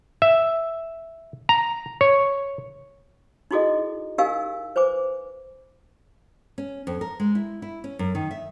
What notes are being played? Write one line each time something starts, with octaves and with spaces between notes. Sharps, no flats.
E5
A#5
C#5
D#4 E4 F#4 G#4 A4 D#5
D#4 G4 A#4 F5 G#5 E6
B4 C5 G#5 D6
C#4
F2
A#4
G#3
E4
E4
C#4
F#2
D#3
E5